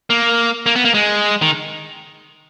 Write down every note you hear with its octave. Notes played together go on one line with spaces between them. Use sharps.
A#3
A#3
B3
A#3
G#3
D#3